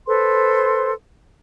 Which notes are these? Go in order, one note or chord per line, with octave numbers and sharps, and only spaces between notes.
A4 B4 C5 C6